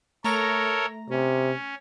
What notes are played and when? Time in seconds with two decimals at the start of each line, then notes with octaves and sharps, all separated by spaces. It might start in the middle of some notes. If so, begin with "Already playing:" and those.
0.24 A3 A4 A#4 C#5 A#5 A#6
1.10 C3 C#4